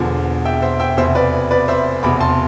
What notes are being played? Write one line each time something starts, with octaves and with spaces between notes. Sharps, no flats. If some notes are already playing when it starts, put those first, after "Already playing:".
Already playing: E1 E2 D3 F3
E5 G5
C5 E5
E5 G5
F1 E2 B2 C5 E5
B4 D5
B4 D5
C5 E5
F1 E2 B2 B5 D6
A5 C6